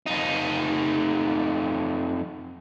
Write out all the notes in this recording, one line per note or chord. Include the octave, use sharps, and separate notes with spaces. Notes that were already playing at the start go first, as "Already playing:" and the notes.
F2 D#4